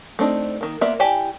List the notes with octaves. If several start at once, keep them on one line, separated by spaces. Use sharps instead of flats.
A3 C4 D4 D#4
D#3 A#3
A#3 B3 F4 D5 E5
E4 G4 D5 G#5 A5